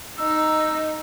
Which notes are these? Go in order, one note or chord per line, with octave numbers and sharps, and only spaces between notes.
D#4 D#5 E6